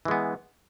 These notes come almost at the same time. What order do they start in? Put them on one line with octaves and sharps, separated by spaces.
E3 G#3 B3